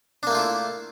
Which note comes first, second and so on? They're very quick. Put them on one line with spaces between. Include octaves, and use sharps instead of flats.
D4 A#3 A3 F4 E4